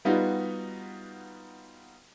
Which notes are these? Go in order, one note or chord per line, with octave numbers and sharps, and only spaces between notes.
G3 B3 D#4 F4 F#4